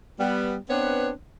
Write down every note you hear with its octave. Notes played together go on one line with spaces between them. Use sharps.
G3 B3
B3 C4 D4 B4 C#5